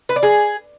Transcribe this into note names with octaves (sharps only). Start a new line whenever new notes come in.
B4
D5
G#4